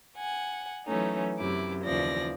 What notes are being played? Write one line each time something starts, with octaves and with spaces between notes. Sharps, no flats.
F#5 G#5
E3 F#3 A3 C#4 D#4
F#2 C3 E4 D6
D#2 C#3 E3 F3 D5 A#6